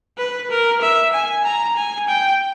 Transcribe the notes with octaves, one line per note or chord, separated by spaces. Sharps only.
B4
A#4
E5
G#5
A#5
G#5
G5